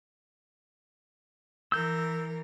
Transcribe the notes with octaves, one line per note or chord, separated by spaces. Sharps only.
E3 A#4 E6 G6